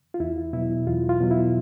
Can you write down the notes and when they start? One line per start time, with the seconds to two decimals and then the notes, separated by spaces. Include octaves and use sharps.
0.14 F4
0.20 E2 E4
0.53 B2 F#3 E4
0.87 E2 F4
1.09 F4
1.21 B2 F#3
1.31 E4